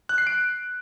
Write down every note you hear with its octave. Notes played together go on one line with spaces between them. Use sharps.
F#6
C7
D7